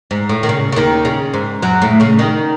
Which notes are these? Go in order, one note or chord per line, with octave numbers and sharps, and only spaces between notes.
G#2
A2
D#3
C#3
C#3
D#2 D#3
C#3
G#2
F#2 F#3
A2 A3
C#3 C#4
D#3 D#4